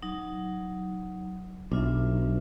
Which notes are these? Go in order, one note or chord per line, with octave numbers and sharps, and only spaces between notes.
F#3 D#4
B1 D4 F4 E5